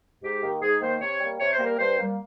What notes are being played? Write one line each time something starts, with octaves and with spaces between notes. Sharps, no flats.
G#2 G4
D#3 A#3
G#2 G#4
D#3 A#3 C5
C3 C#5
G3 A#3
C3 C#5
C5
G3 A#3
A#4
G2 C5
G3 A#3